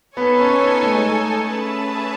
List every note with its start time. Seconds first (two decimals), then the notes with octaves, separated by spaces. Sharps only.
0.17 B3 D#4 A4 C#5 G#5
0.39 C#4
0.60 B3
0.82 A3
0.95 G#3
1.05 A3
1.48 C#4 G#4 B4 E5 A5